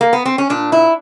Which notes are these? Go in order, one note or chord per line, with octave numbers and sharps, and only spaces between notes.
A#3
B3
C4
C#4
A#2 D4
E4